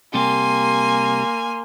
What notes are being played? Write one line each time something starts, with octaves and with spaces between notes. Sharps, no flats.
C3 G3 A#3 G4 G#5 C6